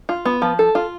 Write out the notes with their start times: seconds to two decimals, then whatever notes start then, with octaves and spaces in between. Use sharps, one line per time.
0.09 F4
0.25 B3
0.42 F3
0.59 A4
0.75 F4